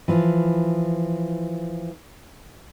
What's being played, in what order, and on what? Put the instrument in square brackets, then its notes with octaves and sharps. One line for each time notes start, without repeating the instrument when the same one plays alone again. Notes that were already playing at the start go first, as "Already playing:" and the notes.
[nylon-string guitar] E3 F3 F4